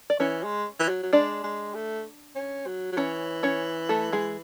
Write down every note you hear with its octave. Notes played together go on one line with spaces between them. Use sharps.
D5
E3 C#4 C#5
G#3
E3
F#3
F#3
G#3 D4 D5
G#3
A3
C#4
F#3
F#3
E3 C#4 C#5
C#4 C#5
A3 A4
G#3 G#4